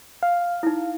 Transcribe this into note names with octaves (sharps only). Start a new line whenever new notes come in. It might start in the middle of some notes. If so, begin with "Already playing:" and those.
F5
D#4 E4